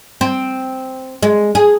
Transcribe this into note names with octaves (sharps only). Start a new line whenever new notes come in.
C4
G#3
G#4